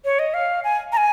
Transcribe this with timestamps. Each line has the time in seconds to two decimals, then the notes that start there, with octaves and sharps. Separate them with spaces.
0.05 C#5
0.19 D#5
0.34 F5
0.64 G#5
0.92 A#5
0.97 G#5